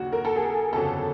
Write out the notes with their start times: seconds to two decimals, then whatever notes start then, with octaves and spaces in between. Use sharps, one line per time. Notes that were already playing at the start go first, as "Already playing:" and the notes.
Already playing: D#2 C#3 F#3 A#3 D4 F#4
0.12 A#4
0.25 A4
0.36 G#4
0.73 G1 F2 C#3 F#3 B3 A4